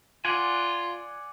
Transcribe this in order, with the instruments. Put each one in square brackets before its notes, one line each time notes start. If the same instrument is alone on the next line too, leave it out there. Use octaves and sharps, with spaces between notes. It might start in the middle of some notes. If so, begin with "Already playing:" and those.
[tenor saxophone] F4 [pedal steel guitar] D5 F#5 G#5